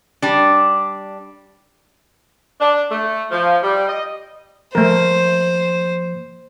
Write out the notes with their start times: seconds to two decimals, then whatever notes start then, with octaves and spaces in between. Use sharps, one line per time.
0.22 G3 D4
2.60 D4
2.90 A3
3.31 F3
3.62 G3
3.87 D#5
4.75 F3 A3 A#3 A#4 C5